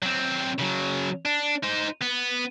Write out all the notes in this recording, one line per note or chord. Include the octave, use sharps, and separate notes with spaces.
F#3 C4
C#3 F#3
D4
D#4 C5
B3